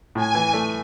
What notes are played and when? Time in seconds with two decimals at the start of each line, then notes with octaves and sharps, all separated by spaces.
0.15 A2 G#5
0.35 E3
0.54 A3